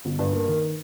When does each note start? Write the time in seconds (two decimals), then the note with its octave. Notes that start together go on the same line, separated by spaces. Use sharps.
0.05 G1
0.19 G2
0.33 A#3
0.48 D#3